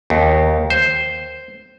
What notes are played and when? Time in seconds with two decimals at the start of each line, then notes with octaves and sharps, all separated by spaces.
0.10 D#2
0.70 C5